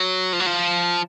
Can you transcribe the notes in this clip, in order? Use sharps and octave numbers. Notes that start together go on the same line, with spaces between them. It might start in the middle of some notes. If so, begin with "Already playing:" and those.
Already playing: F#3
F3
F#3
F3